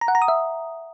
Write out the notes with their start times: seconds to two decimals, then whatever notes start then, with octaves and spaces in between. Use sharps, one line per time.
0.01 A#5
0.08 F#5
0.15 A#5
0.22 D#6
0.28 E5